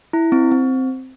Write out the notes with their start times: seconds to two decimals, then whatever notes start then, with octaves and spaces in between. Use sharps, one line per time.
0.13 E4
0.32 C4
0.51 C4